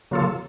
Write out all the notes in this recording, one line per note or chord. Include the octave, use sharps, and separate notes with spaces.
C#3 F#3 A#3 F4 A4